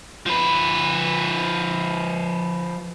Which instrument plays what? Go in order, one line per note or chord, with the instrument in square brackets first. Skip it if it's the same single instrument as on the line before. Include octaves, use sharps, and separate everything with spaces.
[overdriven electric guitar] F3 B4